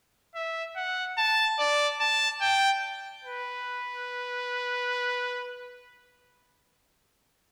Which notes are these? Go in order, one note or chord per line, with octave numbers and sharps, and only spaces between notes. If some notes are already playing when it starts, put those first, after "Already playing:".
E5
F#5
A5
D5
A5
G5
B4